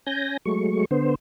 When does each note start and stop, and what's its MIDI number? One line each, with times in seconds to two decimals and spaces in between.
0.07 0.37 61
0.07 0.37 80
0.07 0.37 91
0.07 0.37 94
0.45 0.85 54
0.45 0.85 56
0.45 0.85 57
0.45 0.85 85
0.91 1.15 50
0.91 1.15 59
0.91 1.15 72